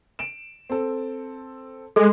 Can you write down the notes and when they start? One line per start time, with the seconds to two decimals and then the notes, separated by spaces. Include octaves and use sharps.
0.19 D7 E7
0.70 C4 A4
1.96 G#3 A4